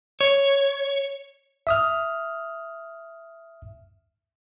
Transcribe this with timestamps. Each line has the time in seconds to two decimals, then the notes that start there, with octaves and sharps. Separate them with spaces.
0.21 C#5
1.67 E5 D#6 F6